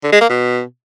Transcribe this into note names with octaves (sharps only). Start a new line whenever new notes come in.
D3
G#3
A#3
B2